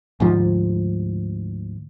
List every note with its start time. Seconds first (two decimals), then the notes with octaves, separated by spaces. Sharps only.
0.20 D2 G#2 F3